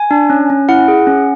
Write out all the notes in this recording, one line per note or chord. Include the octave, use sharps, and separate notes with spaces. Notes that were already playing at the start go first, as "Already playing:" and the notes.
Already playing: G#5
D4
C#4
C#4
E4 F#5
G#4
C#4